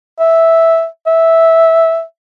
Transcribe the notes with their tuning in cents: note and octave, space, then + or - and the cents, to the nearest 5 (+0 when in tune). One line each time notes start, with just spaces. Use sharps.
E5 -5
E5 -10